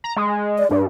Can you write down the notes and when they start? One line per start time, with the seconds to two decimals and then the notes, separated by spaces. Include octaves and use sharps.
0.04 A#5
0.16 G#3
0.59 D5
0.71 G2 D4